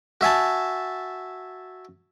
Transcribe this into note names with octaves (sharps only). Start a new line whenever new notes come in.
F#4 E5 G#5 A5